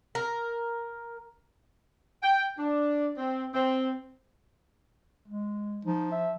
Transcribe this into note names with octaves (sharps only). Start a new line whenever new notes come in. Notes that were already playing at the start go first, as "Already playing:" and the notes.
A#4
G5
D4
C4
C4
G#3
F3 D#4
E5